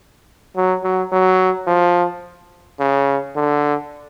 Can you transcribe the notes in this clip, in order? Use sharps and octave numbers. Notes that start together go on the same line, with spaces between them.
F#3
F#3
F#3
F3
C#3
D3